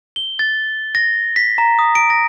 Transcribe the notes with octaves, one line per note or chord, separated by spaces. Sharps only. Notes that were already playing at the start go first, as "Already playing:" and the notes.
G7
A6
A#6
B6
A#5
D#6
D7
A#6